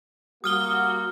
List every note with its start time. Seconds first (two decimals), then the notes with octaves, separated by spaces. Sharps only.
0.44 G3 A#3 F#4 D#6 F6 G7